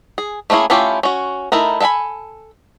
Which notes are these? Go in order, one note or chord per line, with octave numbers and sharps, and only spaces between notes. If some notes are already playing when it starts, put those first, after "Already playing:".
G#4
A3 A#3 C#4 E4 G#4
A3 C#4 E4 F4 G4
C#4 F#4
A3 D#4 E4 A#4
A4 E5 F5 G#5 B5